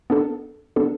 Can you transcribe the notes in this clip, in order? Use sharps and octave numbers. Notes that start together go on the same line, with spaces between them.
B3 D4 A4
B3 D4 A4